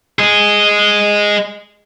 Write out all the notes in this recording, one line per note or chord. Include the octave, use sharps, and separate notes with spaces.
G#4 D#5